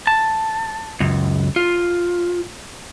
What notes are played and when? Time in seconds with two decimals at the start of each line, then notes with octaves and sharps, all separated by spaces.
0.07 A5
1.00 C#2 F#2
1.56 F4